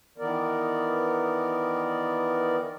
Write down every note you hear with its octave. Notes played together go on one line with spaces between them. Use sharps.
D#3 E3 B3 A#4 D5